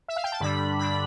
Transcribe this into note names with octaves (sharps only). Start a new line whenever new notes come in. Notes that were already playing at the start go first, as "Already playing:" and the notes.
E5
F5
G5
A5
G2 D3 G3 D4 B5
G2 D3 G3 D4 B5